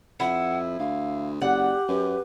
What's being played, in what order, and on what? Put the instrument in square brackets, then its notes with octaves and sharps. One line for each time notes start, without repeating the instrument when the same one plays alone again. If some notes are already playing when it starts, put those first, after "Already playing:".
[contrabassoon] F2 [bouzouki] E4 [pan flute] F#5
[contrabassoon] D2 [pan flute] F5
[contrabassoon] F#1 [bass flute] G4 [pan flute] D5 [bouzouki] F#5
[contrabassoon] F#2 [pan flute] B4